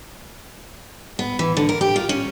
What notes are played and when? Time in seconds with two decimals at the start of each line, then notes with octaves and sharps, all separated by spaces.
1.19 B3
1.39 E3
1.57 D3
1.69 A#4
1.81 G4
1.96 F4
2.09 C#4